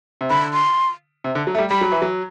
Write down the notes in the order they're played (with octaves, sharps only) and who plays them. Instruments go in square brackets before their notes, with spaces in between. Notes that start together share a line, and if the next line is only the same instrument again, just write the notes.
[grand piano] C3
[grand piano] D3 [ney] B5
[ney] C6
[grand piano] C3
D3
F#3
A3
G3
[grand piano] G3 [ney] B5
[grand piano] F#3
E3
F#3